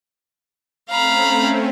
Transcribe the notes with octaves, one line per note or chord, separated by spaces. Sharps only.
A3 C4 C#4 F5 A#5 B5